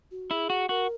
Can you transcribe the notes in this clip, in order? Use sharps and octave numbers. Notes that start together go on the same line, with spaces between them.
F#4
E4 G#4
F#4
F#4 A#4